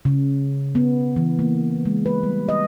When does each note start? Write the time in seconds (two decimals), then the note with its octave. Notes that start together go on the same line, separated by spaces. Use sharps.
0.05 C#3
0.75 B3
1.16 E3
1.39 A#3
1.85 G#3
2.06 B4
2.23 G3
2.49 D#5